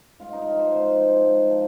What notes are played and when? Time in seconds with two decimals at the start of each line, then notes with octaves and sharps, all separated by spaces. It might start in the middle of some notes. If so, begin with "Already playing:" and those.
0.20 G#2 F4
0.33 D#4
0.46 F3
0.59 C5
0.72 G#2 C5
0.99 F3
1.24 G#2
1.50 F3